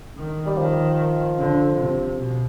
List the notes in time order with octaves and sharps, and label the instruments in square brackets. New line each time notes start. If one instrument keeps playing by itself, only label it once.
[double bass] D#3
[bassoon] G3
[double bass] D#3 [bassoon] F3
[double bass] D3
C3
B2